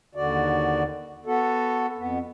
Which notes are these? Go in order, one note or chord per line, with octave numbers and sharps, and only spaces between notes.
D#2 D3 F#4 D5
B3 F#4 A4
F2 B3